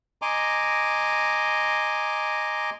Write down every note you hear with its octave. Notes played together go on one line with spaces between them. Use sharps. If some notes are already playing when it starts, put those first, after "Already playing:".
D#5 G#5 A#5 C6 D6